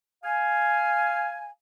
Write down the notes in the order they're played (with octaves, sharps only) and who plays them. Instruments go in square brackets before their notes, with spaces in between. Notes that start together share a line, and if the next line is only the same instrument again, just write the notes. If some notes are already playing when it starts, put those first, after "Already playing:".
[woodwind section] F5 G#5